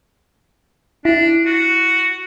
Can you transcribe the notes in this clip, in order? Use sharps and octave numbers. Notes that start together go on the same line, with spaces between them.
D4 E4
F#4